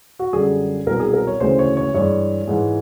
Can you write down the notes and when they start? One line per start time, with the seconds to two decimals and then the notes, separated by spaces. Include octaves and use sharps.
0.19 F#4
0.33 F#2 D3 G3 G#4
0.87 C2 B2 F#3 A#4
1.00 G#4
1.13 A#4
1.27 C#5
1.40 D2 C#3 E3 G#3 C5
1.59 C#5
1.77 C#5
1.94 G2 E3 G#3 C#5
2.48 G#2 E3 G#3